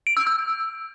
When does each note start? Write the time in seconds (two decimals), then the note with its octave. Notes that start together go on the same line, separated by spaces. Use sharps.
0.07 D7
0.17 E6
0.27 E6